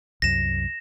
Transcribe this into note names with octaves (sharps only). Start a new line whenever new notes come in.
C2 F#2 A#6 E7